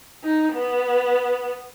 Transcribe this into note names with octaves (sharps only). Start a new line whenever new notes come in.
D#4
B3